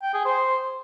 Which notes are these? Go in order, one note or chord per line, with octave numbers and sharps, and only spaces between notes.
G5
G#4
C5